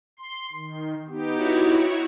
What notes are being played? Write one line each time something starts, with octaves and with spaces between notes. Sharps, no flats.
C6
D#3
B3 D#4 G4
E4 F#4 C#5